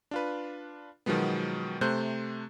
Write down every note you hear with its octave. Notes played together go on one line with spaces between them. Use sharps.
D4 F4 B4
B2 D#3 F3 F#3 G#3 B3
C3 A3 C5 F#6 G6